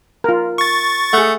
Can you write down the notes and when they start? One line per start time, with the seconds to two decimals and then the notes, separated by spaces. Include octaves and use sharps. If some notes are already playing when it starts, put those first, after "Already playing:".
0.24 F4 A#4
0.58 C#6 A6
1.13 A3 G#4 F#5